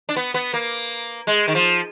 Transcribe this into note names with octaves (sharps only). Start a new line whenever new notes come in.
D4
B3
B3
A#3
G#3
D#3
F3